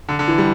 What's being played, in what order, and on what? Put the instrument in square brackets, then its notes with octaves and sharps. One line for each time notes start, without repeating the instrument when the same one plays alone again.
[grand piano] D3
D3
E3
G3